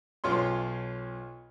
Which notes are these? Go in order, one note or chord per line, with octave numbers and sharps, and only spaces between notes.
B1 F4 C#5 C6